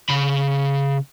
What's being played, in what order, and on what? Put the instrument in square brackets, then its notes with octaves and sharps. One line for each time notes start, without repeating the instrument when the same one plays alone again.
[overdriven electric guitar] C#3 B5